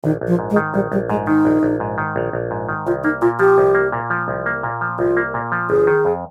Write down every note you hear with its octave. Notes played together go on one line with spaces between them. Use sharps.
A#1 D#3
A#1
F3
G#2
G#3
D#3
A#1 G3
A#1 G3
G#2 G#3
D#3 D#4
A#1
A#1
G#2
D#3
A#1
A#1
G#2
D#3
C2 F4
A#3 D#4
A#2 F4
F3 G4
C2
A#3
A#2
F3
C2
A#3
A#2
F3
C2 F4
A#3
A#2
F3
G1 G#4
D#3
F2